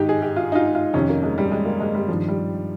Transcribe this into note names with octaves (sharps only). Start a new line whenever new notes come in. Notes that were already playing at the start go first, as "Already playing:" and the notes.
Already playing: G#2 D#3 D#4 G4
G#4
G4
F4
D#4
F4
F4
F2 C3 D#3 C#4
A#3
G#3
G3
G#3
A#3
G#3
G3
G2 D#3 F3
G3